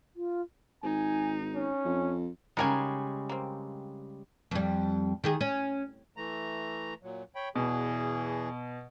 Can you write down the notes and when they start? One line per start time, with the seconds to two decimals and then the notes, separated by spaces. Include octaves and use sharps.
0.16 F4
0.84 G#1 D#4 G#5
1.55 C#4
1.85 F2
2.57 C#3 G3 G#3 D#4 A#4 G#5
3.29 A#3 C4
4.51 F2 G3
5.24 D#3 G4 G#4
5.41 C#4
6.17 E3 A3 A#5
7.03 A#2 F#3
7.35 C#5 G5 B5
7.55 E2 B2 E3 G#4